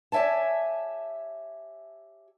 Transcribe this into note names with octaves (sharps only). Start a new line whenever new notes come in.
G4 C#5 E5 G#5 A5